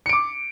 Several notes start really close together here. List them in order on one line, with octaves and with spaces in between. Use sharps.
C#7 D7 D6